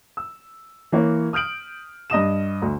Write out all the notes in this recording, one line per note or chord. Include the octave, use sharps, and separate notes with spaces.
E6
E3 A#3 C#5
D#6 F6 G6 D7 F#7
G2 D#5 D#6 E7
D2